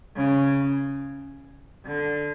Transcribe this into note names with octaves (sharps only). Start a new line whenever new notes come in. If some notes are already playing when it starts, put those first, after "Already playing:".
C#3
D3